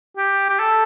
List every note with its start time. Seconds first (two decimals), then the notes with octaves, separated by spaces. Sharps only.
0.17 G4
0.49 G4
0.60 A4